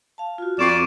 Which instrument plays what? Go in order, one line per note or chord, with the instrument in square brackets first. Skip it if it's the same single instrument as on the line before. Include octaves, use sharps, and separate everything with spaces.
[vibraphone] F5 A5
F4 F#4
[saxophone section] F2 [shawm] D5 [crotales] C#6 E7